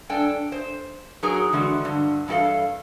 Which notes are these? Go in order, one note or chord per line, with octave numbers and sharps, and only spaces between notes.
G2 D4 A4 G5 G#5
C5
F#3 D#4 G#4 A#4 G#5 A#5
D3 E3 G#3 F#4
G2 D3
G2 E3 G4 A4 F5